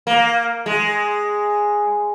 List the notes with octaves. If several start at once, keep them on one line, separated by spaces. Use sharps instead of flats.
A#3
G#3